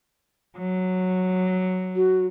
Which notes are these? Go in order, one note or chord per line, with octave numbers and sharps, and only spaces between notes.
F#3
F#4